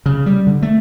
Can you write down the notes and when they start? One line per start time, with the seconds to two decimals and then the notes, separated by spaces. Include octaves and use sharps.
0.06 C#3
0.26 G3
0.47 D3
0.62 A3